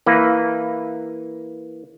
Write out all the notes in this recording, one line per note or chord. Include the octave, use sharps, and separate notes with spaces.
E3 A#3 B4